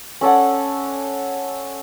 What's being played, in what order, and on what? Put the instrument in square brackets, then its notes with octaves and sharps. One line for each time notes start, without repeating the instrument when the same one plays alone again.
[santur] C#4 A4 D5 F#5